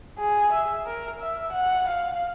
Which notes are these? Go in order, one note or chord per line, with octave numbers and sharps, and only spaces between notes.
G#4
E5
A#4
E5
F#5
F5